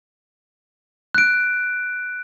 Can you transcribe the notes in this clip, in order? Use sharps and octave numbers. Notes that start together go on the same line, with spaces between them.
F#6 D7